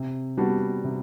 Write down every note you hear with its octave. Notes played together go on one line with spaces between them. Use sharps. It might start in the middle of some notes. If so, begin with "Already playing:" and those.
Already playing: C3
G3 B3 D4 F#4
C3